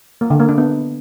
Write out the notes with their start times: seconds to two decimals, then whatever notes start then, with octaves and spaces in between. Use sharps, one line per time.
0.21 A#3
0.30 D3
0.40 A#3
0.49 D4
0.58 B3